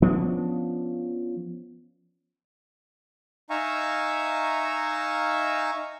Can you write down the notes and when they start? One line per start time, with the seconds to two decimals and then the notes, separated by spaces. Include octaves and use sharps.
0.02 F3 B3 C#4 D4
3.50 D#4 E5 F5 G#5 A#5 C#6